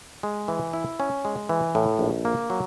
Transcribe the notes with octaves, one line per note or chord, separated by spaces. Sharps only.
G#3
E3
E4
C#4
G#3
E3
A2
A#1
A#3
F#3